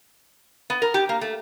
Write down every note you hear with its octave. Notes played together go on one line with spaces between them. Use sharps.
B3
A#4
G4
A#3
A3